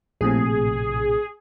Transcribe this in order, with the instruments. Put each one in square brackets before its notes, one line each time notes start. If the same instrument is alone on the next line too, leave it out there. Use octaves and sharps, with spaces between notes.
[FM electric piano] A#1 A2 C3 [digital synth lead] G#4